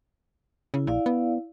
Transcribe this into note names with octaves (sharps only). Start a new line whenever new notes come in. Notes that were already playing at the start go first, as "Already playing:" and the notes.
C#3 E4
A#1 E4 D5 F5
B3